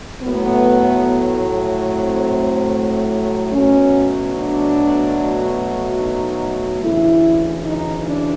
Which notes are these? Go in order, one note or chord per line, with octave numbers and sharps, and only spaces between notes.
A2 F#3 A3 B3
C4
B2 F#3 A3 C#4
D4
D#4
D2 C#3 E3 E4
D#4
D4